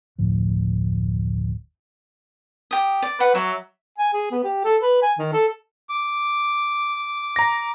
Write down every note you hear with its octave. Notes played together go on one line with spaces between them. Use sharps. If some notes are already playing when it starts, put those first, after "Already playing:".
F#1 D2 A2 F3
G4 D#6
D5
B4 F#5
F#3 E5
G#5
G#4
B3
G4
A4
B4
G#5
D#3
A4
D6
A#5 A#6